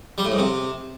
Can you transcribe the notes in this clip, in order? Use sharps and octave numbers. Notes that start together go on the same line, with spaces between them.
G3
A2
G#2
C3